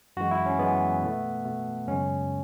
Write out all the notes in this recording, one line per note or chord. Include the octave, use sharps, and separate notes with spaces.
F#2 E3 G#3 F#4
E4
C#4
F#2 E3 G#3 B3
B2 A3
B2 A3
F#2 C#3 G#3 C#4